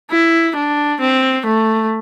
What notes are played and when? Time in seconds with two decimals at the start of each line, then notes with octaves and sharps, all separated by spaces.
0.11 E4
0.56 D4
1.01 C4
1.46 A3